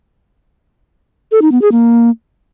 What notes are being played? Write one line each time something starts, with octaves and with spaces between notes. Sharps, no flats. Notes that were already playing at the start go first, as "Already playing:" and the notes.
A4
D#4
B3
G#4
A#3